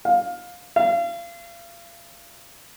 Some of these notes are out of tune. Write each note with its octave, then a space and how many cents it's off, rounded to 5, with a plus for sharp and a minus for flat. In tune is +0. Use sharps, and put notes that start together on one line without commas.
F5 +20
F5 -35